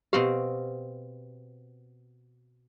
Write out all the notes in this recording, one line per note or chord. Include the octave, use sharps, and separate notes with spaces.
B2 C4 G4 F5